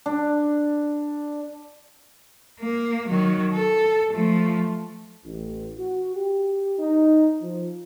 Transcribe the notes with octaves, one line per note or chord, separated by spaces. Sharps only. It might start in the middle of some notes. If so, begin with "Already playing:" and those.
D4
A#3
D#3 F#3
A4
F3 A3
A1
F#4
G4
D#4
F3